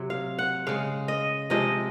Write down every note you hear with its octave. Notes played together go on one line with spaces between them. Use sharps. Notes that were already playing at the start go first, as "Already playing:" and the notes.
Already playing: C3 F#3
F5
F#5
C#3 G#3 F5
D#5
C3 F3 G#3 D#5